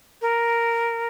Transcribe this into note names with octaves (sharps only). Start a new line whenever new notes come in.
A#4